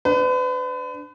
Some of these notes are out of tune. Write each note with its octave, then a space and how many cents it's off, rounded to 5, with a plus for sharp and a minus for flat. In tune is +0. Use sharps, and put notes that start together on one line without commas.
D4 +0 B4 +40